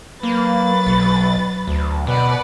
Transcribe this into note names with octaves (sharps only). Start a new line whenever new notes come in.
F#3 A#3 B4 A6
B1
D2
B2 B4 D5 F#5